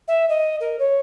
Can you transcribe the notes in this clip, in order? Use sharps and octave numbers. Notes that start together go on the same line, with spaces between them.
E5
D#5
A#4
C#5